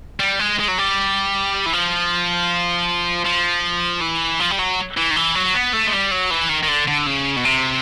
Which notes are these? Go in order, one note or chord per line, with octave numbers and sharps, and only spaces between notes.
G3
G#3
G#3
F#3
G3
E3
F3
F3
E3
F3
G3
F#3
E3
D#3
E3
F#3
B3
A3
G#3
G3
F#3
E3
D#3
D#3
D3
D3
C#3
B2
C3